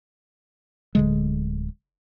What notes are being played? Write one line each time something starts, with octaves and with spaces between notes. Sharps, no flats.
D1 D3 G#3